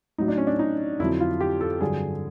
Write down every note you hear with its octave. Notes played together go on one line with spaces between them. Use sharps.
A2 F#3 D#4
D4
C#4
D4
D#4
F2 D3 F#3 E4
F4
G4
A4
G2 D3 F#3 G#4